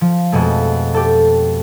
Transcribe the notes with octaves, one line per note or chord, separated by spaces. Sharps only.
F3
F2 B2 G#3 A3
G4 A4